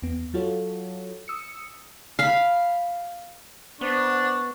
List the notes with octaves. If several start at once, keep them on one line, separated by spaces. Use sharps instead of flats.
E2 B3
F#3 F4 F#4 A4 C#5
D#6 E6 C#7
F5 B5
B3 D4 C5 C#6